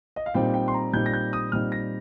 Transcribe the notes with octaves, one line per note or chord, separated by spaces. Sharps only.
D#5
F5
A#2 G3 C4 D#4 G5
G5
C6
A#5
A#2 G3 C4 D#4 G6
A#6
G6
D#6
A#2 G3 C4 D#4 F6
A#6